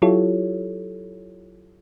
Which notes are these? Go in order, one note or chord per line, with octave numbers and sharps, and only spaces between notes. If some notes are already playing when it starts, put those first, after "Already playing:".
F#3 E4 F4 G4 A4 C#5